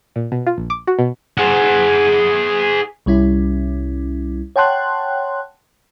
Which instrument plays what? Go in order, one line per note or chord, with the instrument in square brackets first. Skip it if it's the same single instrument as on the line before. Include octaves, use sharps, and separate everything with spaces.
[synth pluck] A#2
B2
F4
A#1
D6
F#4
B2
[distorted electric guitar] G#4 F#5
[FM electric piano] C2 G3 C#4 E4
C#5 F#5 G5 A5 C6 F#6